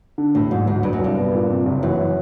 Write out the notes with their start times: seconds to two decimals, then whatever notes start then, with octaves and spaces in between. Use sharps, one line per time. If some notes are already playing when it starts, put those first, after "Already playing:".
0.18 D3
0.35 E1 A2
0.50 G#2 F#3
0.66 D2 G#2
0.83 G2 F#3
0.93 F#2
0.99 C2 G2
1.16 B3
1.33 A#2
1.50 C3
1.66 F#1
1.83 F#2 E3